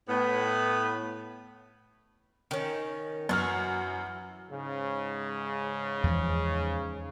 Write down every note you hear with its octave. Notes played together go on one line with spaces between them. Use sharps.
A2 B3
D#3 C#4
F#2 E3 F#4 F6
G#2 C#3
E2 F3